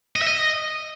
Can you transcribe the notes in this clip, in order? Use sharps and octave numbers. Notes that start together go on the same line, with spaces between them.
D#5
E5
D#5